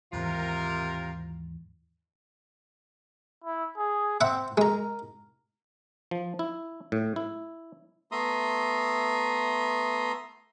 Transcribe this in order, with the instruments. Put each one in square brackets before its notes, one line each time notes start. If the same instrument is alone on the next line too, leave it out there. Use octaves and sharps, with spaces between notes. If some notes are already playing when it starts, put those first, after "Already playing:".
[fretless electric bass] D#2 G#2 E3 [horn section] C3 F4 A#4
[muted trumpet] E4
G#4
[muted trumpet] C4 [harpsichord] E5 F#5 B5
[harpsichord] G#3 A#5 [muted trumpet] A#4
[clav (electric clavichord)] F3
E4
A2
E4
[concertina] A3 B3 E5 A#5 C6 D#6